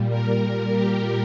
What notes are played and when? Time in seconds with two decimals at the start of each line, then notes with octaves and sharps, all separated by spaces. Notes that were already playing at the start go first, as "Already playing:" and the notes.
Already playing: A#2 G3
0.09 A#4
0.72 G4